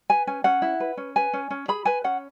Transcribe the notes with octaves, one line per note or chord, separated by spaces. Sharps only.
B4 G#5
C#4 G#5
C#4 F#5
E4
B4
C#4
B4 G#5
C#4
C#4
G#4 B5
B4 G#5
C#4 F#5